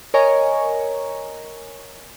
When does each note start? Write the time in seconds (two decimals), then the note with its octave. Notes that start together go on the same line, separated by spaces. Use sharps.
0.14 A#4 C#5 D#5 G#5 A#5 C#6